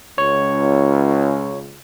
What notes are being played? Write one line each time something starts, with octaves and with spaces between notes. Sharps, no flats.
C#2 C#5